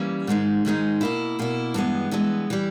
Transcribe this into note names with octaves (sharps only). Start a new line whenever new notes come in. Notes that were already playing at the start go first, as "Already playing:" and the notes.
Already playing: E3 G3 A#3 C#4
G#2 D#3 G#3 D#4
G#2 D#3 G#3 D#4
B2 A#3 E4
B2 A#3 E4
G2 E3 G#3 B3
G2 E3 G#3 B3
E3 G3